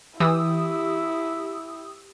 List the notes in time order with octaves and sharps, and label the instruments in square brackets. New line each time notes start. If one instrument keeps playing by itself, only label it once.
[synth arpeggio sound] E3 [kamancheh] E4 [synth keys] G4 D#6 E6